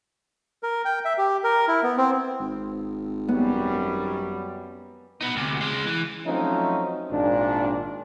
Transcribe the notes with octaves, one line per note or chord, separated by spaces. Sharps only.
A#4
G5
E5
G4
A#4
E4
B3
C4
G#1
F#2 G3 B3
B3 D#4
D2 C3
G#3 C#4
E3
F3 F#3 A3 C4 C#4 D#4
G#1 A#2 D4